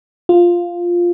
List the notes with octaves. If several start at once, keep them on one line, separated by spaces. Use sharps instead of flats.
F4